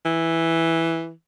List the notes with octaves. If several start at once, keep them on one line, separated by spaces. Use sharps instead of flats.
E3